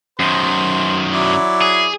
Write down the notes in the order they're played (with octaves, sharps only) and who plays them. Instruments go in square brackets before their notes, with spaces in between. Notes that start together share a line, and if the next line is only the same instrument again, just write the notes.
[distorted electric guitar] F#2 D#3 [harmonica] C5
[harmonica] F#3 E4 D5
[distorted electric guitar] G#4